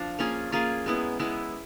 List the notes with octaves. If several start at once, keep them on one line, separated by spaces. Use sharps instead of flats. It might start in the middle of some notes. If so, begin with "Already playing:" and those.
Already playing: F3 D4
A#3 C#4 F4 G#4
A#3 C#4 F4 G#4
G#3 B3 E4
G#3 B3 E4